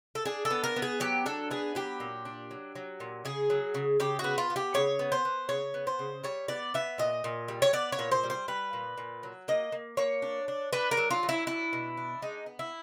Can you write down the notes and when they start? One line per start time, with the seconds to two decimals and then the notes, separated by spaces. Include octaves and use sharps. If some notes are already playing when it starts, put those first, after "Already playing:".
0.15 A4
0.25 D4 G#4
0.45 A4
0.50 B3
0.64 A#4
0.76 B3
0.82 G#4
1.00 F#3 G4
1.26 D4 A4
1.51 B3 G#4
1.75 F#3 G4
2.00 A#2
2.25 D4
2.51 F#3
2.75 F#3
3.00 A#2
3.25 C#3 G#4
3.50 F#3
3.74 C#3
4.00 C#3 G4
4.19 F#4
4.24 B3
4.38 F4
4.50 B3
4.56 G4
4.74 C#3 C#5
4.99 B3
5.12 C5
5.25 B3
5.49 C#3 C#5
5.74 B3
5.87 C5
5.99 C#3
6.24 G3 C#5
6.48 B3 D5
6.74 B3 E5
6.98 A#2 D#5
7.24 A#2
7.48 G3
7.62 C#5
7.73 B3 D5
7.92 C#5
7.99 A#2
8.11 C5
8.24 G3
8.30 C5
8.48 G3 B4
8.73 A#2
8.98 A#2
9.23 F#3
9.48 A#3 D#5
9.72 A#3
9.97 A#3 C#5
10.22 D4
10.48 D4
10.73 D4 B4
10.91 A#4
10.97 F#3
11.10 F4
11.23 F#3
11.29 E4
11.47 D4 E4
11.73 B2
11.97 D4
12.22 G#3 D#4
12.46 B3
12.59 E4